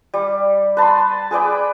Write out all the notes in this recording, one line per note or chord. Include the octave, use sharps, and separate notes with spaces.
G3
B4 A5 B5 C6
G#4 B4 D5 G5